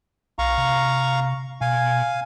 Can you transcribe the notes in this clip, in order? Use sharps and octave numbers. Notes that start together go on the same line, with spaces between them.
B1 F5 A#5 C#6
C3
B2 F5 G#5